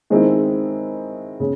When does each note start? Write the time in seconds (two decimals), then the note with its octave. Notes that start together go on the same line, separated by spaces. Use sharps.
0.10 D#3 G#3 C4 E4
1.40 C#3